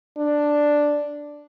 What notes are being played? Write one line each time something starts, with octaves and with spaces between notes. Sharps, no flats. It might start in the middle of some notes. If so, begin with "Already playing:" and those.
D4